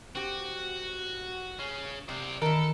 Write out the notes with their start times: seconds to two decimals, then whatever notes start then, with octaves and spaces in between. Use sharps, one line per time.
0.15 C4 F#4 G4
1.59 C#4 G#4
2.09 C3 C5 D5
2.42 D#3 E3 A4 A#4